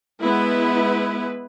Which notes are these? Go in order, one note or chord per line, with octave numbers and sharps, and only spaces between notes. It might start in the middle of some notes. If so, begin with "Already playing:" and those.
G#3 B3 E4 B4